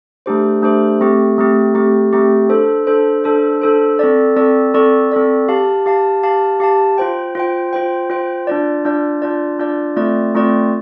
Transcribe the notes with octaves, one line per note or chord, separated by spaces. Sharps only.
A3 D4 G4 C5
A3 D4 G4 C5
A3 C4 G4
A3 C4 G4
A3 C4 G4
A3 C4 G4
D4 A4 C5
D4 A4 C5
D4 A4 C5
D4 A4 C5
C4 A4 D5
C4 A4 D5
C4 A4 D5
C4 A4 D5
G4 F5 A5
G4 F5 A5
G4 F5 A5
G4 F5 A5
F4 C5 G5
F4 C5 G5
F4 C5 G5
F4 C5 G5
D4 F4 D5
D4 F4 D5
D4 F4 D5
D4 F4 D5
A3 C4 F4 D5
A3 C4 F4 D5